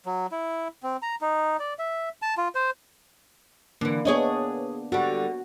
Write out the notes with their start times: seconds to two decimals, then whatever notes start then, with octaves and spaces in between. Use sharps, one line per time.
0.06 F#3
0.31 E4
0.83 C4
1.02 A#5
1.21 D#4
1.59 D5
1.79 E5
2.22 A5
2.37 F4
2.55 C5
3.81 D3 E3 A#3
4.05 B3 D4 G#4 C#5 D#5
4.92 D3 G3 F#4